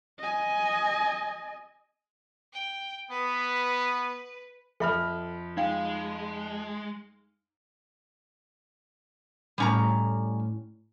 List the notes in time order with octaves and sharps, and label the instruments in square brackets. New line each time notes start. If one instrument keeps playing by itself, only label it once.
[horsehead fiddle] D#5 G#5
[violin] G5
[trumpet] B3 [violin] B4
[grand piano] F2 B5 F6 [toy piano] A4 E5
[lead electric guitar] G#3 [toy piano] D#4 F5 G5
[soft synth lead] A2 [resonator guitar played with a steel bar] G3 C#4 A#5